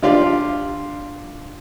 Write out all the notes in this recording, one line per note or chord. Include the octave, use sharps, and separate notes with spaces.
D3 F4 G4 D5 F5